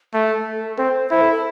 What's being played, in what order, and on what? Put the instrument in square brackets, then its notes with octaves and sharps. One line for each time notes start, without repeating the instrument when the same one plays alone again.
[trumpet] A3 [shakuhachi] A4
[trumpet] C4 [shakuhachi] C5
[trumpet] E4 [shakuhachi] C5
[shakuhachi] A4
A4